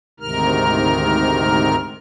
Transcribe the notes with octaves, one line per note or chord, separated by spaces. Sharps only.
D2 G#2 C3 D#3 A#4 F6